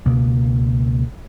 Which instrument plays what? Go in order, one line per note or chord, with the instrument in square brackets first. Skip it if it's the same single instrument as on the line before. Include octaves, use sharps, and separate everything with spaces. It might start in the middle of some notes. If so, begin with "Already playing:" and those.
[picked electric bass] C#2 B2 A#3